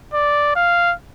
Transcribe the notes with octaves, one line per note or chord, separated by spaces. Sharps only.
D5
F5